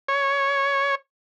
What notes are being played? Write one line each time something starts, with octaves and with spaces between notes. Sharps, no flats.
C#5